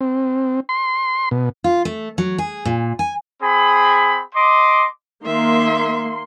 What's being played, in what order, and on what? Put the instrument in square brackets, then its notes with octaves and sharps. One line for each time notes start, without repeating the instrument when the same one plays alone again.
[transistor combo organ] C4
C6
B2
[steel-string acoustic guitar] F4
A3
F#3
G#4
A#2
G#5
[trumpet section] C4 G#4 B5
D#5 C6 D6
[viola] D#3 E5 [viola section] A#3 C6